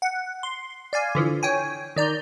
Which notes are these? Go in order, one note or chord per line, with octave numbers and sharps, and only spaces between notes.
F#5
C6
D5 F5 G#5
D3 E3 F3
C#5 G5 G#5
D#3 D5 A#5 G6